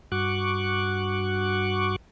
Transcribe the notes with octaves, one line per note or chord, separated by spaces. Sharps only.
G2 F#4 C#6 D6 F#6